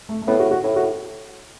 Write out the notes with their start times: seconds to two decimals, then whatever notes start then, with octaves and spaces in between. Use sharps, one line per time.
0.09 A3
0.22 A3
0.27 A2 B3
0.40 F#4
0.51 F#4
0.64 A2 E4
0.76 F#4